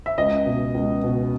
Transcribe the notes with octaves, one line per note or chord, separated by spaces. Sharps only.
E5
C#2 D#5
B2
C#2
B2